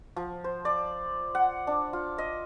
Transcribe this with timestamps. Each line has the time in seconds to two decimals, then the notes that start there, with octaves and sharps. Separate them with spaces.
0.16 F3
0.44 C5
0.65 D5
1.35 F#5
1.67 D4
1.93 F4
2.18 D#5